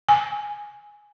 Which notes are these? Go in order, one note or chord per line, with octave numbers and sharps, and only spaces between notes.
G#5